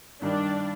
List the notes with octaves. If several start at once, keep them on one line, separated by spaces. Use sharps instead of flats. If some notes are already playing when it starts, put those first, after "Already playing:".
G2 D#3 G3 D4